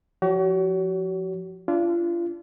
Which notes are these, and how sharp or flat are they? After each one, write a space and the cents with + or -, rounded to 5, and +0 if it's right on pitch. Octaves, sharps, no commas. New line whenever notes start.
F3 +5 F#4 +45 C#5 +30
D4 -15 F4 -35